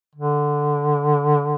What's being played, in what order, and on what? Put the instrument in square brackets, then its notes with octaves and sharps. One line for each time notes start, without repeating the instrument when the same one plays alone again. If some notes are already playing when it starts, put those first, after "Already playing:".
[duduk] D3